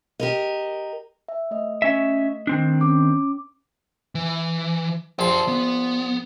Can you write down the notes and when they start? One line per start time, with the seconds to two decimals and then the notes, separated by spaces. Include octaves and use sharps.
0.20 G4 A#4 D#5
1.28 E5
1.51 A3 D#5
1.82 C#4 E5
2.47 D#3 C4 D4
2.81 C#4 D6
4.15 E3
5.19 A#1 G4 A5 C6
5.48 B3